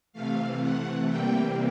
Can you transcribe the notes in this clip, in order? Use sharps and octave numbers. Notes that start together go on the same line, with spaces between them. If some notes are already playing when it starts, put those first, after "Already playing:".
C3 E3 A3 F5
F#5
C3 E3 G3 A#3 G5